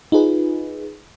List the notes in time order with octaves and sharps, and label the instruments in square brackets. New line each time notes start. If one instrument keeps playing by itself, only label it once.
[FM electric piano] D#4 F4 G#4 B4